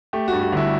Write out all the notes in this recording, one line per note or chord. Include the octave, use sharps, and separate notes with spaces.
A3 G4
G2 F#4
F#4
G1 E4